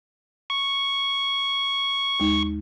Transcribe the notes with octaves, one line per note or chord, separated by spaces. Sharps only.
C#6
D#2 G#3 D#4